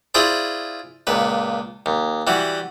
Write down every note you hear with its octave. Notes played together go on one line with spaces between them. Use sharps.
E4 F4 G#4 C5 D5
C#2 A#2 B4
D#2
E3 G3 F#4